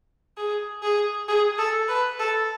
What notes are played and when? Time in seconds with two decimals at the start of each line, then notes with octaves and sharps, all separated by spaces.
0.37 G#4
0.83 G#4
1.28 G#4
1.58 A4
1.88 B4
2.19 A4